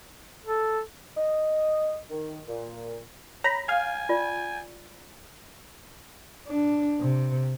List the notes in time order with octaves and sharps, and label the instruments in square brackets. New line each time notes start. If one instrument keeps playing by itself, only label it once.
[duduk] A4
[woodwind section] D#5
D#3
A#2
[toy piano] C#5 [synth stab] A#5 B5
[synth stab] F5 [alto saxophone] G#5
[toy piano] F4 D5
[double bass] D4
C3